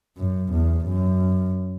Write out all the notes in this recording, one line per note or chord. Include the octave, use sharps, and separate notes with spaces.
F#2
E2
F#2